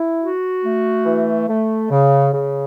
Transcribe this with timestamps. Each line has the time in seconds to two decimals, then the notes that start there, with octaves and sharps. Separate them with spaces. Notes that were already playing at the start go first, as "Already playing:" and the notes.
Already playing: E4
0.21 F#4
0.64 A3
1.05 E3
1.48 A3
1.91 C#3
2.33 C#3